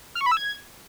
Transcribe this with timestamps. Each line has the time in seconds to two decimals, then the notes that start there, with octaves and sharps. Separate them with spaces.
0.15 F6
0.21 C#6
0.26 B5
0.32 E6
0.37 G#6